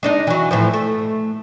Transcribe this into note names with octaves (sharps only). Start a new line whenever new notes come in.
G#3 D4 D#4
E3 F#3
A2 E3 F3
A3